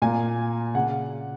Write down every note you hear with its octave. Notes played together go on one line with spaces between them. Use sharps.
A#2 A#3 G#5
C#3 F#5